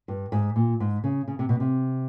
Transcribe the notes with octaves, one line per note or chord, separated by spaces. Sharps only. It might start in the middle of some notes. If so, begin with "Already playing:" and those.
G2
G#2
A#2
G#2
C#3
C#3
C3
B2
C3